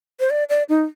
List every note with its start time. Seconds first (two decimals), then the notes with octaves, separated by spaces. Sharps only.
0.20 C5
0.30 D5
0.49 D5
0.69 D#4